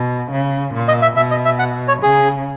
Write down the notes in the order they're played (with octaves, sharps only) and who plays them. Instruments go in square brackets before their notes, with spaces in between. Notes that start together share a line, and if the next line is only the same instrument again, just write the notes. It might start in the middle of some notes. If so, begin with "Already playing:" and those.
Already playing: [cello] B2
C#3
A#2
[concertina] D#5
E5
[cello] B2 [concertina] E5
[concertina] D#5
E5
F#5
C#5
[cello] C#3 [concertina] G#4